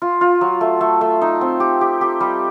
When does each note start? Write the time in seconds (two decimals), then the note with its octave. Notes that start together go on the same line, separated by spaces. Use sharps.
0.02 F4
0.21 F4
0.41 F#3
0.61 A3
0.81 A3
1.01 A3
1.21 D#4
1.41 C4
1.60 G4
1.81 G4
2.01 G4
2.20 G3